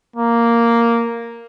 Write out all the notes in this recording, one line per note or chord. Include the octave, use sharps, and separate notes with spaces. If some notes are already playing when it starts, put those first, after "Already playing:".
A#3